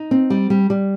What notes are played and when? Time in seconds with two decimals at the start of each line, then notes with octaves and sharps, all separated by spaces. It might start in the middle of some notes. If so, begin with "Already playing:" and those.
Already playing: D#4
0.11 C4
0.30 G3
0.50 G3
0.70 G3